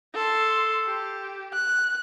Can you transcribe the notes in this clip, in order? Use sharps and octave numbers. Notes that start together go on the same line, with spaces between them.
A4 C6
G4
F#6